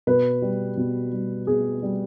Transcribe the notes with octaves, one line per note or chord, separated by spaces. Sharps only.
B2 B4
G3
B2
G3
B2 G#4
G3